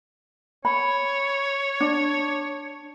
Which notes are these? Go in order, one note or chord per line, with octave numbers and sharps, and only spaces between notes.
C#5 B5
D4